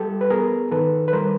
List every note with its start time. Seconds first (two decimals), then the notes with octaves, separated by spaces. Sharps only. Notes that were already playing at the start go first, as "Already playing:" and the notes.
Already playing: G3 G4 A4
0.21 B4
0.30 B3 G#4 A#4
0.71 D#3 A4 B4
1.08 B4
1.13 G3 A#4 C5